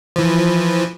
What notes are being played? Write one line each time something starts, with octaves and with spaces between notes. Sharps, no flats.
E3 F3